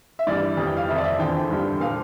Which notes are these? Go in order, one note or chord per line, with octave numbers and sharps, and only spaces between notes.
E5
G2 E3 G3 D5
F2 E3 G3
G5
F5
F2 C3 F3 E5
D5
E5
E2 D3 F3 G5
G2 D3 G3
A#2 F3 F5